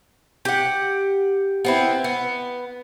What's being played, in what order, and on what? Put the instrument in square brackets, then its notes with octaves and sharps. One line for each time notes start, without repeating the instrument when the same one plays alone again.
[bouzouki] G4 F#5
B3 C4 E4
B3